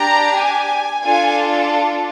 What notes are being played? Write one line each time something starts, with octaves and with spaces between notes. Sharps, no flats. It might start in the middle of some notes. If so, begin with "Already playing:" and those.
Already playing: D4 G4 A#5
G#5
D4 F4 A4 G#5